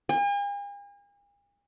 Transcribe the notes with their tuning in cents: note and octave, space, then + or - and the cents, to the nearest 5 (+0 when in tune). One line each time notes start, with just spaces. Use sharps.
G#5 -45